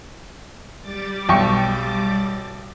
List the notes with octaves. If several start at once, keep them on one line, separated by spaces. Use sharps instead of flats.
G3 D6 A6
B1 G5 C#6